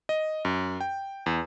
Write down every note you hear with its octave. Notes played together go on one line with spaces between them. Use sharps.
D#5
F#2
G5
E2